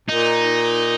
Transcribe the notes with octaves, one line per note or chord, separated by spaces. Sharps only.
A#2 D#4